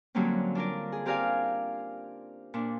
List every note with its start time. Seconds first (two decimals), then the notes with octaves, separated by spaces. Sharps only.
0.15 D3 F#3 G3 A#3 C4 C#4
0.55 D4 F4 A#4 D5
0.92 G#4
1.06 C4 G4 A#4 D5 F5 G#5
2.54 A#2 D4